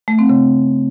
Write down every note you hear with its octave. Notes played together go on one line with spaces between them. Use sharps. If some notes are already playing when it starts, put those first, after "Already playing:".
A3
C4
C#3